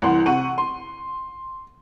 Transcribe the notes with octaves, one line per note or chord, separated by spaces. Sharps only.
C2 E3 F#5 C6
C3 F#5 C#6 D#7
C6